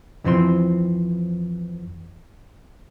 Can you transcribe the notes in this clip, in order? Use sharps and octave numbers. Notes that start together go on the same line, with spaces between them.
F2 E3 F3 C4 C6